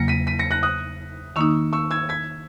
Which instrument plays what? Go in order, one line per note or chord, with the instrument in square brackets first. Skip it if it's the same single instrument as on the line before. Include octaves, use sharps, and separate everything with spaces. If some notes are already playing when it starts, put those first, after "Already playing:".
Already playing: [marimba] E2 C#3 F#3 A#3 [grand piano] A#6 C#7
[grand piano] B6 D#7
B6 D#7
A#6 C#7
F#6 A#6
D#6 F#6
[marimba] D#3 A#3 D#4 [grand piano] C#6 E6
[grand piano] C#6 E6
E6 G#6
G#6 B6